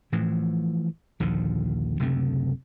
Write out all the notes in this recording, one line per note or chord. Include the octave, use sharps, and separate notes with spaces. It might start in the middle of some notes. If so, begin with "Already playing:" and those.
A2 E3 F3
A#1 D#2 D3 F3
F#1 D2 C3 A3